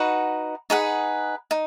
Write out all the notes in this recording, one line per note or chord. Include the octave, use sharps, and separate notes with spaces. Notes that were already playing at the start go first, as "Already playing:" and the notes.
Already playing: D#4 F#4 B4 F#5
D#4 G#4 B4 F#5
D#4